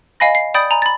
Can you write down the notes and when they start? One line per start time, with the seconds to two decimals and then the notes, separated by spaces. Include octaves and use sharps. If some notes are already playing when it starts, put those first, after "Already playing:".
0.20 D#5 F5 G#5 B5 A#6
0.35 C7
0.54 D5 G5 B5 D#6 G6 A6
0.71 G#5 A#5 B5
0.82 B5 A6